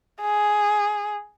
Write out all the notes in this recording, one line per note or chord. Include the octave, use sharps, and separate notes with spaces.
G#4